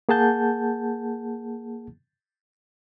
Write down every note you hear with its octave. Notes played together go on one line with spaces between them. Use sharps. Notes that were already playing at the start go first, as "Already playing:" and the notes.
A#3 G#4 F#5 A5 G6